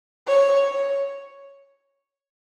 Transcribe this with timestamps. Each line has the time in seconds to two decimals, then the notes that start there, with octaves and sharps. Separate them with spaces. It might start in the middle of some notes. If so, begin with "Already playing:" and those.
0.27 C#5
0.66 C#5